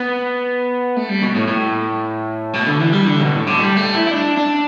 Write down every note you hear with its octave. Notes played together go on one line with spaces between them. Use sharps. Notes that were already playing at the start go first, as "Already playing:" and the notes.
Already playing: B3
A3
G3
B2
A2
A2
B2
D3
E3
G3
D3
B2
A2
D3
G3
A3
E4
E4
D4
D4